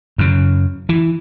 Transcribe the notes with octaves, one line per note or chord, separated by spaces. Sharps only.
F#2 C#3
E3